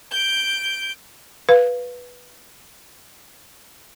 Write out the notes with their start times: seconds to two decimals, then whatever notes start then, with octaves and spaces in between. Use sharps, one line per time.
0.11 G6 D7
1.49 B4 F5